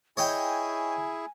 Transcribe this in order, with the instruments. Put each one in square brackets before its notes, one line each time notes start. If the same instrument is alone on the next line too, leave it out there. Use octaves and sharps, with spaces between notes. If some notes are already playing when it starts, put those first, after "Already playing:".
[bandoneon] E4 G#4 [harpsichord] C#5 D#5 G5 [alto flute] G#5